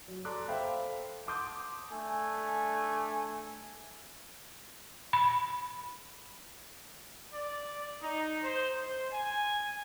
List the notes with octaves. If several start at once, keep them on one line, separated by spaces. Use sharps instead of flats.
F#3
A4 D5 A#5 C6 D6 F#6
A4 C5 E5 F5 G5 B5
F#5 A5 C6 D6 D#6 G6
A3 D4 G#5
B5
D5
D#4
C5
C5
G#5